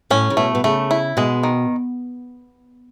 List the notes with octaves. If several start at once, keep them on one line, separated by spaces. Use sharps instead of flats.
A2 C#4
C#3
B2 A3
B2
C#3 A3
E4
B2 G#3
D#3